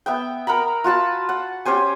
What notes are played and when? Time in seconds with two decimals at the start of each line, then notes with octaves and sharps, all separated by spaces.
0.06 B3 E5 G5
0.47 A#4 F#5 A#5 B5
0.84 F4 F#4 A5 B5
1.29 F#5
1.65 C#4 G4 C5 G#5